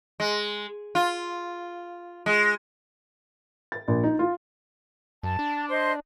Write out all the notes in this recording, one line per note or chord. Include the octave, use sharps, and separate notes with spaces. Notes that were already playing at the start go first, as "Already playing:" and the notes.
G#3
F4
G#3
A6
A#1
D#4
F4
F#2 A5
D4
C5 D#5 C6